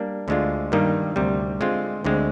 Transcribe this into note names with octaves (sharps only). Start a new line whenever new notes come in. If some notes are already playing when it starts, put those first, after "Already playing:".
Already playing: G3 A#3 D4
D2 D3 G#3 D4 F4
G2 D#3 G3 A#3 D#4
D2 C3 G3
D3 G#3 C4 F4
D2 D3 G#3 C4